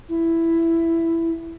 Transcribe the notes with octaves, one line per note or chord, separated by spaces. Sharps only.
E4